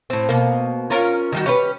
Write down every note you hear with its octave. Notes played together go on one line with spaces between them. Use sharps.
A2 C4
B2 A#3
C#4 F4 A#4
D#3 G3 F#4
C#4 G4 B4